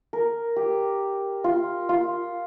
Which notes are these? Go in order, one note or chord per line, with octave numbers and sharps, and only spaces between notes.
A#4
G4
F4
F4